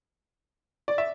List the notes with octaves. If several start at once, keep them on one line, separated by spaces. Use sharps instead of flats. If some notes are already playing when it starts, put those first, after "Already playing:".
D5
E5